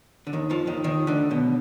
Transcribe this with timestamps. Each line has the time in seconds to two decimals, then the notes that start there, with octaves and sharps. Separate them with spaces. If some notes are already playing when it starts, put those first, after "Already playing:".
0.27 D3
0.33 D#2 D#3
0.50 F2 F3
0.67 D#2 D#3
0.84 D#2 D#3
1.07 D2 D3
1.31 B1 B2